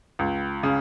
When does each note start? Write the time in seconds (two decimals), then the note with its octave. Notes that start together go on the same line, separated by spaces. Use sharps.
0.19 C#2
0.63 C#3